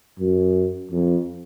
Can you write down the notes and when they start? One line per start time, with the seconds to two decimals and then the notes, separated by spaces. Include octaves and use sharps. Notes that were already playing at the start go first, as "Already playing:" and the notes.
0.19 F#2
0.91 F2